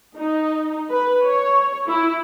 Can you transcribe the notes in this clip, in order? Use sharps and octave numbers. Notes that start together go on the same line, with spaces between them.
D#4
B4
C#5
E4